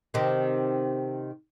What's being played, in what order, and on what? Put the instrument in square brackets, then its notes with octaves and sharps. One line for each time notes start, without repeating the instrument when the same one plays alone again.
[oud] C3 D#3